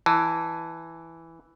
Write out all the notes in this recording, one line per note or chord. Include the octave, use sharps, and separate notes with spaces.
E3 A5